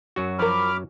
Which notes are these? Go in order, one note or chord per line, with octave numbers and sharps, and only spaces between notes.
F#2 F#3 F#4
F3 A#4 B5 D6 F6